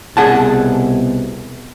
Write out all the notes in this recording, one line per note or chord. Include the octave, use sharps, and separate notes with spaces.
C2 B2 G#4 F#5 A5